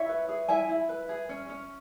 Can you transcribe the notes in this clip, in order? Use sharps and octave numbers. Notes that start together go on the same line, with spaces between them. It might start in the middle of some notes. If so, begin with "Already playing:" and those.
Already playing: E4 C#5 E5
B4
G#4
E4 E5 G#5
E4
B4
G#4
C#4
C#4